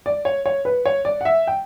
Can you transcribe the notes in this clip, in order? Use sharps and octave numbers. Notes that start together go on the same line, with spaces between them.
D5
C#5
C#5
B4
C#5
D5
F#5
E5
G5